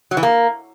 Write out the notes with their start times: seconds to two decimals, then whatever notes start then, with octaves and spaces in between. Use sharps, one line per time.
0.11 F#3
0.17 E3
0.23 A#3